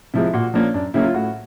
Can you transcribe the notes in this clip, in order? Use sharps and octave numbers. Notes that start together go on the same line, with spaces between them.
C3 F3 G#3 E4
A#2 F#4
F3 A#3 C#4 D4
F#2 D4
C#3 F#3 A#3 C#4 E4
F4
A2 F#4